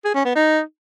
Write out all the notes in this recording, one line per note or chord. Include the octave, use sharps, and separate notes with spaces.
G#4
C#4
B3
D#4